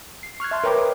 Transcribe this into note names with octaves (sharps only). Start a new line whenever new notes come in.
C7
C#6 F6 F#6 G#6
E5 A5 C6
A#4 B4 C#5 G5 A#5 D6
D#5